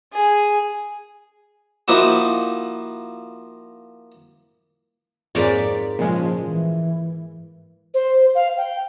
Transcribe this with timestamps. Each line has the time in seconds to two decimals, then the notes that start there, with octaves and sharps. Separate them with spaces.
0.13 G#4
1.88 F3 A#3 D#4 E4 F#4
5.35 F2 G#2 A#3 C#5 D5 B6
5.99 A#2 C#3 F3 G#3
6.45 E3
7.94 C5
8.35 F5
8.57 G5